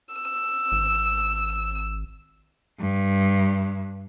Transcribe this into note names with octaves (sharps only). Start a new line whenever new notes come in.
E6
G#1
G2